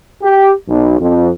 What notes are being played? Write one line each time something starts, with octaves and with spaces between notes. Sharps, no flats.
G4
B1
F2